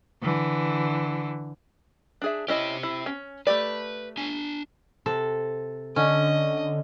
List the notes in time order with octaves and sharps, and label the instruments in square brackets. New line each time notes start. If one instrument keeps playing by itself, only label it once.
[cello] D3 E3
[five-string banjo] D4 G#4 E5
[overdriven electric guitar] C4 G4 [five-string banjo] C#4 E4 D#5
[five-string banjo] E4
C#4
[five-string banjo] A3 G4 D5 [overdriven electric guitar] B4
[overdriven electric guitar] D4 G#5
[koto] C3 A4
[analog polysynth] D3 [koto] C#4 [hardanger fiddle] D#5